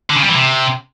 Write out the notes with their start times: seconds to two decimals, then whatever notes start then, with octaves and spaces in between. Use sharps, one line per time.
0.10 D3
0.16 C#3
0.23 G3
0.29 E3
0.35 C3